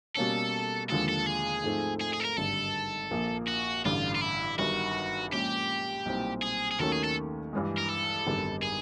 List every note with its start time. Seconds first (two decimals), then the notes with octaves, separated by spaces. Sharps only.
0.17 B2 G3 A#3 C#4 A4
0.90 D#2 D3 F3 G#3 A4
1.09 A4
1.27 G#4
1.64 G#2 F3 A3 C4 D#4
2.01 G#4
2.14 G#4
2.20 A4
2.25 A#4
2.37 G#1 G2 D3 G3 A4
3.11 A#1 A#2 F3 A#3
3.47 F#4
3.85 A1 G2 D3 F4
4.15 F4
4.21 E4
4.58 G1 G2 D#3 F#3 F#4
5.32 A#2 F3 G#3 C#4 G4
6.06 B1 A#2 G3 C4 E4
6.42 G#4
6.71 G#4
6.79 D#2 D#3 F#3 A3 C#4 A4
6.92 G#4
7.04 A4
7.53 G2 E3 G#3
7.78 A#4
7.89 A4
8.27 G#1 F#2 D3 G3 B3
8.63 G#4